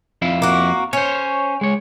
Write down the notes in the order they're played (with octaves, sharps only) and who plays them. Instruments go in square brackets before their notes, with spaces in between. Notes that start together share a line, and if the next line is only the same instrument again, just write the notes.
[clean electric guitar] F2 E4 F5
[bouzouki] A#3 F#4
[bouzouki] C#4 [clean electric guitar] C5 C#5
[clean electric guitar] G#3 C#5